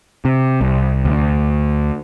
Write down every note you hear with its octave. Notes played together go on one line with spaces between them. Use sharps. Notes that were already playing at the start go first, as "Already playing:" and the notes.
C3
C2
D2